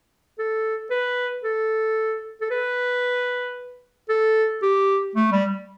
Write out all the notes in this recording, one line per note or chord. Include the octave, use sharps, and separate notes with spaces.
A4
B4
A4
A4
B4
A4
G4
A3
G3